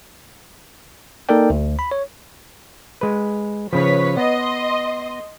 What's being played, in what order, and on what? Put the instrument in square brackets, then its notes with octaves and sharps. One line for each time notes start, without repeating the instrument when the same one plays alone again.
[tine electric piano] A#3 D#4 A4 A#4 D5 G5
D2
B5
C#5
[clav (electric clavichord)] G#3 B4
[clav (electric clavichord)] C#3 F3 [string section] B4 C#5 B6
[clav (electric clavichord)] B3 [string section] D#5 C6